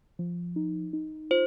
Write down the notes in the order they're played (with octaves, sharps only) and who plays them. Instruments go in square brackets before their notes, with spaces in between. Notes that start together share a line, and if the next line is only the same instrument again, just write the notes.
[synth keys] F3
D#4
D#4
[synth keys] F4 [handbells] C5